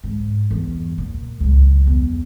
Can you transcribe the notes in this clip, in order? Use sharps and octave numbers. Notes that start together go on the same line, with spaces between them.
G#2
E2 G2
A#2
C#2 F#3
E2